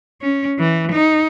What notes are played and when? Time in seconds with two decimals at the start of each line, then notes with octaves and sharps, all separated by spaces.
0.22 C#4
0.58 E3
0.92 D#4